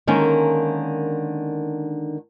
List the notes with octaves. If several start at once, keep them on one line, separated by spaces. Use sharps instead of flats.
D3 D#3 G#3 A#3 C#4